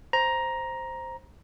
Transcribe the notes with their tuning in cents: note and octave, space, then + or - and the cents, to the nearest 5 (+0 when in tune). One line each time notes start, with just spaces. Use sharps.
C5 +0 A#5 +10